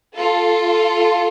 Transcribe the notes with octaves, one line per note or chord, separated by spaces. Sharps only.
F4 A4